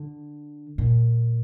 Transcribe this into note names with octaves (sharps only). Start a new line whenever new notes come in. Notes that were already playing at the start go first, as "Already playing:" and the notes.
Already playing: D3
A#2